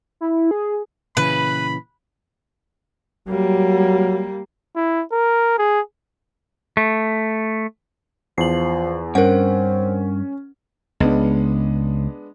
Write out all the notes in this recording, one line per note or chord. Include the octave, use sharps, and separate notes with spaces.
E4
G#4
A#2 C#3 E3 B4 B5
F#3 G3 A#3
E4
A#4
G#4
A3
E2 F3 C7 F#7
G2 C4 C#4 A#4 F#5
C#2 G#3 B3 D4